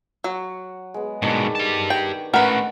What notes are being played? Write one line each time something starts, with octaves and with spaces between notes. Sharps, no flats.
F#3 F#5
G#3 B3
G#2 B2 D#3 D4 C#6
G4 A5
G5
A3 C#4 A#4 B4 F#5